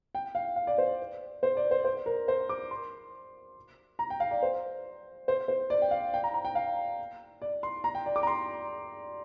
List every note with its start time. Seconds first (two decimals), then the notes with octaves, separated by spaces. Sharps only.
0.15 G5
0.35 F5
0.56 F5
0.67 D5
0.78 C5
1.43 C5
1.57 D5
1.71 C5
1.85 C5
2.06 A#4
2.28 C5
2.49 D6
2.71 C6
3.99 A#5
4.10 G5
4.20 F5
4.31 D5
4.42 C5
5.28 C5
5.48 C5
5.70 D5
5.82 G5
5.91 F5
6.14 G5
6.24 A#5
6.34 A#5
6.45 G5
6.55 F5
7.42 D5
7.63 C6
7.84 A#5
7.95 G5
8.06 D5
8.16 D6
8.23 A#5
8.27 C6